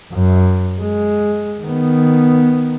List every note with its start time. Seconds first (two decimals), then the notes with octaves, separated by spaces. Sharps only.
0.13 F#2
0.80 G#3
1.62 D#3 B3